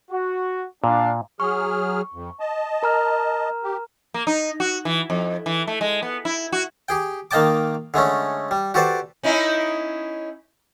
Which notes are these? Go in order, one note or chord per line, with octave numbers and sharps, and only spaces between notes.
F#4
A#2 D4 F5
F#3 G#4 C#6 F6
F2
D#5 A5
A#4 A#5 F6
G4
A#3
D#4
F#4
E3
F2
E3
A3
G#3
B3
E4
F#4
G4 G#4 G5
D#3 A#3 D#5 G5 A5 D6
D3 G#3 A3 C#4
G3
F#4 G4 A4 B4 C5 D5
C#4 D#4 E4